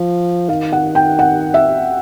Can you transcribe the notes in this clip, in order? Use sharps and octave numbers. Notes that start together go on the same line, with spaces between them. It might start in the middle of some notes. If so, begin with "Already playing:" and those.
Already playing: F3
D#3 F5
F#5
G5
F#5
E5